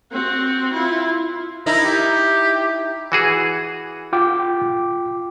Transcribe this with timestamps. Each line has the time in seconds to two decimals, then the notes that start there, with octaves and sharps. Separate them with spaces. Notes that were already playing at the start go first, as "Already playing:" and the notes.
0.12 C4 F#4
0.73 E4 F4
1.66 D#4 E4 A#4
1.84 G4
3.12 E3 F#4 G#4
4.13 F4 G5 D6